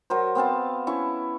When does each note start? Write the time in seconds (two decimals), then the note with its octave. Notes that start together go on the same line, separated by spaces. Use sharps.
0.10 F#3 A#4 C5
0.35 B3 C4 F5 A5
0.87 C#4 E4 C#6